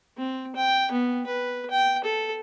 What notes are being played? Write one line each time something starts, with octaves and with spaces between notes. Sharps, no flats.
C4
G5
B3
B4
G5
A4